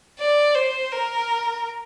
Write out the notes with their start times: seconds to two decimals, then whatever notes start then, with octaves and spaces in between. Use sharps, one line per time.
0.19 D5
0.55 C5
0.91 A#4